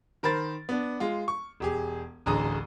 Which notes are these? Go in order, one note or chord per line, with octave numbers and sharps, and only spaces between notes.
D#3 A#4 C5 B5 A6
B3 D4
G#3 F4
C#6
E1 G4 G#4
D1 A1 D3 G#4 A#5 D#6